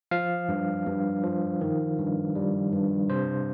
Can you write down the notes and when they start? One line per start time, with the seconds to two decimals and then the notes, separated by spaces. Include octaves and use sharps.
0.11 F3 F5
0.49 G2
0.87 G2
1.23 F3
1.61 D#3
1.99 G2
2.36 G3
2.73 G2
3.10 C3 C5